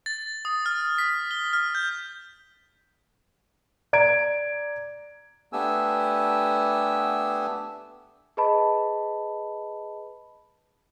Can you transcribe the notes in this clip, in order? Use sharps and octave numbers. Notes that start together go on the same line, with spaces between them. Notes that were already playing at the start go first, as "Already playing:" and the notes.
A6
D#6
F6
B6
G7
F6
G6
D5 A#5 G#6 D7
A3 B3 D4 G4 G#5 E6
G#4 B4 D#5 A5 B5